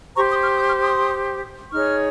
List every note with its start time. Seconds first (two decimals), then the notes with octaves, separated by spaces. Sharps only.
0.16 G4 C5 A#5 C#6
0.30 C6 D#6
0.43 C#6 F6
0.55 D#6 G6
0.68 C#6 F6
0.81 C6 D#6
1.72 D#4 G#4 C#5 C#6 F6